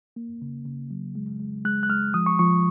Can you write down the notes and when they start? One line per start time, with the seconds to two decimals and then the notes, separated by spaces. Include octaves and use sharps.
0.16 A#3
0.42 C#3
0.66 C#3
0.91 F#3
1.15 G#3
1.40 G#3
1.65 G#3 F#6
1.83 F#6
1.90 G#3 F6
2.14 F3 D#6
2.26 C#6
2.39 F3 C#6